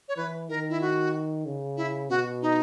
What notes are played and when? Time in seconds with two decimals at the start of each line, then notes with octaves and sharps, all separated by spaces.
0.08 C#5
0.17 E3 B4
0.49 D#3 A#4
0.69 E4
0.81 F#4
1.46 C#3
1.77 E4
2.09 B2 F#4
2.42 D#4